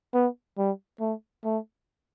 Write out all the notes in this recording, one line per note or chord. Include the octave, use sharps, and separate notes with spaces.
B3
G3
A3
A3